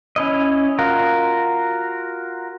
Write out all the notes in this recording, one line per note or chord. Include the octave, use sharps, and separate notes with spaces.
C#4 E4 D#5
F4 F#4 A#4